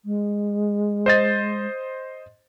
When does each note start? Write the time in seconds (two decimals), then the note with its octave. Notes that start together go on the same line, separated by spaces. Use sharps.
0.05 G#3
1.06 C5 D#5 A6